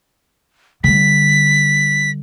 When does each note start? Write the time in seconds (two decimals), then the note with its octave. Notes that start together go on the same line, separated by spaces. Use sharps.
0.84 D3 G3 B6